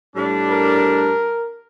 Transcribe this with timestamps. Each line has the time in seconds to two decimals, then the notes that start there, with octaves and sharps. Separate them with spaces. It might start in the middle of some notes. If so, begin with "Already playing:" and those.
0.16 A2 G3 D4
0.51 A#4